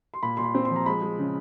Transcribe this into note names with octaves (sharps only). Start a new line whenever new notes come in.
C6
A#2 B5
A#2 C6
B5
C4
C6
F3
A#5
G#3 B5
G#3
C#3